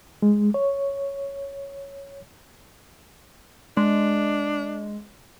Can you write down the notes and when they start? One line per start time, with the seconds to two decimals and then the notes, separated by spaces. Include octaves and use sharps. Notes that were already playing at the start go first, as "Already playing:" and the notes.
0.22 G#3
0.54 C#5
3.77 G#3 D4